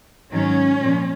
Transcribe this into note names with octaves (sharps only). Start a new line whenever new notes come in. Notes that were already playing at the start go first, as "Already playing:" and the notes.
G#2 D#3 F#3 C#4
A#2 F3